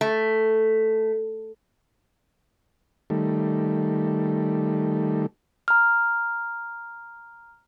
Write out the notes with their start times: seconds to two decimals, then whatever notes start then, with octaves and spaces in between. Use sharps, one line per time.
0.01 A3
3.10 D#3 G3 A3
5.68 A#5 F6